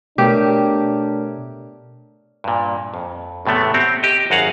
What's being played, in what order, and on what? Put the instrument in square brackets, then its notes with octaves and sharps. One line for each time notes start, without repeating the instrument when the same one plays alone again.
[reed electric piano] B2 [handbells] A3 A#4 C#5 [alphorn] D4 [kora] G4
[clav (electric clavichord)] G2 A#2
F2
E2 A2 C3 A3 B3
C4 F#4 G4
G4 D#5
G#1 F#2 F#4 G#4 F5 F#5